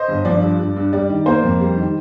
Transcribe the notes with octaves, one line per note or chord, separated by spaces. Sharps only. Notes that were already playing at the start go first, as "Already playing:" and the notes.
Already playing: C5 D#5
G1
F3 D5
G2
G2
G2
G3 D5
D#3
A#3 C5
F2
G3
D#3